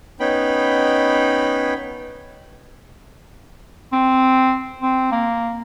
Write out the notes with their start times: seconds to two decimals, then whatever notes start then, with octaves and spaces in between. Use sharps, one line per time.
0.20 B3 C#4 D#4 G5 B5
3.92 C4
4.82 C4
5.12 A#3